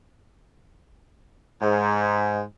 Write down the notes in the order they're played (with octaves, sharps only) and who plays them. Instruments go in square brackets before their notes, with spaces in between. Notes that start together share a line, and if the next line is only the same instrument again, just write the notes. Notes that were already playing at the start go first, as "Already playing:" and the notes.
[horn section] G#2